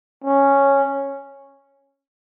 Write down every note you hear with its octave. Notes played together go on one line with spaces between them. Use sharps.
C#4